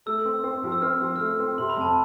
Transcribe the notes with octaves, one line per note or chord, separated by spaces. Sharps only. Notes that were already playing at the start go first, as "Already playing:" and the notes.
A3 E6
C4
C4
F3
E6
C4 F6
F3
F6
A3 E6
C4
C3 C6
B5
F2 A5